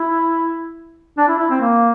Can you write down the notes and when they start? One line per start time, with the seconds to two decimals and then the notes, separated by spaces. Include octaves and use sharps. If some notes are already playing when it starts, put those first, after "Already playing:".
Already playing: E4
1.18 D4
1.28 E4
1.39 E4
1.50 C4
1.61 A#3